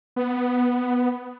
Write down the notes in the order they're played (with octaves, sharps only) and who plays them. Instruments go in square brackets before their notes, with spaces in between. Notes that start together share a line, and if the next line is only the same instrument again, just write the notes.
[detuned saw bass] B3